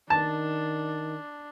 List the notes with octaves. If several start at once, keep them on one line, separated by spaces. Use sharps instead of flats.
D#3 D4 A5